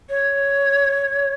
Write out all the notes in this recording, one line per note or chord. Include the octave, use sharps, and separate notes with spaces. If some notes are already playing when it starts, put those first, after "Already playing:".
C#5